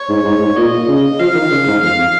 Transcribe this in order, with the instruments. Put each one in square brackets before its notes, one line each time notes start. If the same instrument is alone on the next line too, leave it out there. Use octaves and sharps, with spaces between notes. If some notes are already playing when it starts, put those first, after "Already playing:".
Already playing: [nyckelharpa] C#5
[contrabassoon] G#2
G#2
G#2
[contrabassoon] A#2 [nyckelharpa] D#5
[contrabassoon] C#3
[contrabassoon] F3 [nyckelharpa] F5
[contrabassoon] D#3
C#3
G#2
[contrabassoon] F2 [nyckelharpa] F5